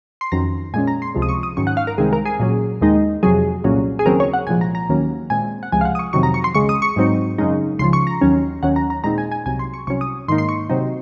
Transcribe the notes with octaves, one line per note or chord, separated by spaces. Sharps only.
C6
F2 D#3 F#3 C#4 A#5
A#2 G#3 C#4 G#5
A#5
C6
C#2 C3 F3 G#3
D#6
C#6
D#6
G#2 D#3 F#3 C#4 C#6
F#5
F5
A#4
C2 C3 D#3 G#3 C4 G#4
A#4
G#4
A#2 F#3 C#4
D#2 D#3 G#3 D#4
F2 C3 F#3 G#4
C2 A#2 F#3 C#4
G#4
D#2 C#3 F#3 C4 A#4
C#5
F#5
C2 A#2 F3 G#3 G#5
A#5
A#5
D#2 D#3 F#3 A#3 C#4
A#2 G#3 C4 G#5
F#5
C#2 C3 F3 G#3 G#5
F5
F#5
D#6
C#6
F2 C3 D#3 F#3 C#6
A#5
C#6
C6
C#2 C#3 G#3 C#6
D#6
C#6
G#2 F#3 C4 D#4
F#2 C#3 G#3 D#4
C#2 C#3 F3 C6
C#6
A#5
D#2 D#3 F#3 C#4
D#2 D#3 F#3 C#4 F#5
A#5
A#5
A#2 G#3 C4 D#4 A#5
G#5
G#5
C2 C3 F#3 G#5
C6
C#6
C2 C3 F#3 C#4 C#6
D#6
G#2 D#3 A#3 D#4 C6
C6
C#6
C3 F#3 C4 D#4